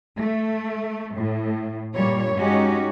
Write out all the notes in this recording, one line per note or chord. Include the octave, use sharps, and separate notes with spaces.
A3
A2
G2 A#2 G3 C#5
G#3 C#4 D#4 F#4 G4